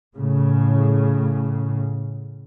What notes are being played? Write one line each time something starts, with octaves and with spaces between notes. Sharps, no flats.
A2 C#3